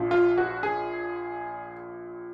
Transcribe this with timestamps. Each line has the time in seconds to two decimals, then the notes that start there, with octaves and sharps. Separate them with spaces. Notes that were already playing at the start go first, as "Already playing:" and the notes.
Already playing: A#1 A#2 F3
0.11 F4
0.38 F#4
0.63 G#4